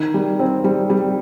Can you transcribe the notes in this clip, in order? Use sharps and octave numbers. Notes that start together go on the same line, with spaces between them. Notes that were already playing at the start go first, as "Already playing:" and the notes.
Already playing: D#3
G3
C4
G3
G3